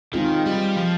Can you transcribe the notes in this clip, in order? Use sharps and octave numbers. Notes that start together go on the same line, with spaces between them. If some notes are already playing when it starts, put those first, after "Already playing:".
D#3 G#3 C4 F4 G#4
G3
F3